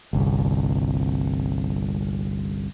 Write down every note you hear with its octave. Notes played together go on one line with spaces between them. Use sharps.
G1 C2